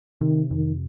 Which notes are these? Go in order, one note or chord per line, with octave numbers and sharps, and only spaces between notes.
C3 D#3
F2 D#3